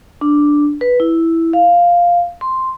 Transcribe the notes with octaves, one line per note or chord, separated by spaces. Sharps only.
D4
B4
E4
F5
C6